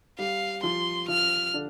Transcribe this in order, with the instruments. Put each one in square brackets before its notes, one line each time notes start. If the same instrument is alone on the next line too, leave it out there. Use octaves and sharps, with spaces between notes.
[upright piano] G3 G4 [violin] F5
[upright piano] F3 F4 [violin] C6
[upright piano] F3 F4 [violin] F6
[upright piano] D3 D4